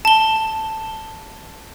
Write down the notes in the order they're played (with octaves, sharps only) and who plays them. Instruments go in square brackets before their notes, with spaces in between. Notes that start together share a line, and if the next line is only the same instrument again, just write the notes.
[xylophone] A5 G7